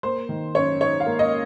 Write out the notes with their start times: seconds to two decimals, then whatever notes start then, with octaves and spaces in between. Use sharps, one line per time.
0.03 A#3 C5
0.29 D#3
0.55 F#2 C#5
0.81 D#4 C#5
1.00 F5
1.06 A#3
1.19 D#5